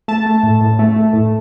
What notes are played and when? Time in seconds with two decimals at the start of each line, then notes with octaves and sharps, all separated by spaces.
0.08 A3 A5
0.26 A3
0.43 A2
0.61 A2
0.79 A3
0.97 A3
1.13 A2